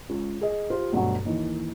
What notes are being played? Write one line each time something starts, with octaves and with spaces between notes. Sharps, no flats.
C#2 C#4
G#4 D#5
F4 G4 C5
D2 G2 B2 F#3
D#2 D#3 E3